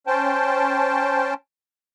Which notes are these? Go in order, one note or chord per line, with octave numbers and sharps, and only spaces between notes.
C#4 C5 G5 A5